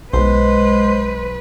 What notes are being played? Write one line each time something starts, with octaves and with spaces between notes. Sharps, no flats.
B1 G#3 B4 C5